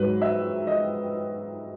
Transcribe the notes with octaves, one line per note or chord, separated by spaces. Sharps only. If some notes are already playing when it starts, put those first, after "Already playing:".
Already playing: G#2 F#3 B4
E5
D#5